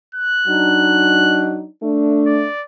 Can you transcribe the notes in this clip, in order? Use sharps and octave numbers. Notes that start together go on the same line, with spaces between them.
F#6
F#3 D4 D#4
A3 D4
D5